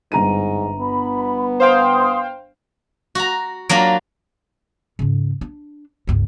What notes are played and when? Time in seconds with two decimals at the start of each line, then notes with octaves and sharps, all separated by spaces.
0.12 G1 G#2 A#5 D#7
0.79 B3 B5
1.60 C5 F5 G5 C6 D#6
3.15 F#4 A#5
3.69 F#3 A#3 D4 F4
4.99 G#2 C#3
5.41 D4
6.07 G1 C#2